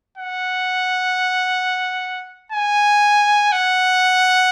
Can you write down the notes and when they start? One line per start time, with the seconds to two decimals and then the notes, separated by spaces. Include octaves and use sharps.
0.17 F#5
2.52 G#5
3.52 F#5